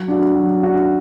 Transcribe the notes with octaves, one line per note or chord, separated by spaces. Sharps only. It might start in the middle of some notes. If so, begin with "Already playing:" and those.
Already playing: F#3
D4 F#4
F#3
D4 F#4